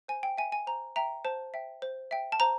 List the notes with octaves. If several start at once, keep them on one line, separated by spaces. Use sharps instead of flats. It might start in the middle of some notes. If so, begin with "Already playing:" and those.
C5 G#5
G5
E5 G5 G#5
G#5
C5 A#5
E5 G5 A#5
C5 A5
E5 G5
C5
E5 G5
A5
C5 A#5